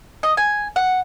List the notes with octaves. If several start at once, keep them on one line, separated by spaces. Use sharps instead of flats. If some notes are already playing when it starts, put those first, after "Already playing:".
D#5
G#5
F#5